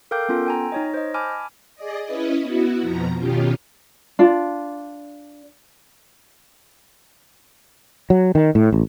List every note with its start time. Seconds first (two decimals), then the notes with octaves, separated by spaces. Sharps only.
0.11 A4 A#4 F5 G5 D6 G6
0.29 B3 C#4 F4 A4
0.46 G5 G#5 A#5
0.72 D#4 C#5 D#5
0.94 C5 D#5
1.14 G#5 A5 B5 D6 F6
1.75 G#4 D5 D#5
2.05 C#4 E4 B4 D#5
2.42 B3 E4 F#4
2.81 F2 B2 F3 A#5
3.18 B2 D#3 C#4 F4 G4
4.19 D4 F4
8.10 F#3
8.35 D#3
8.55 A2
8.72 A1